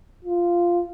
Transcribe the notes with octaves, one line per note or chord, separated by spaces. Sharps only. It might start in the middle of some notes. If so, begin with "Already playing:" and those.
F4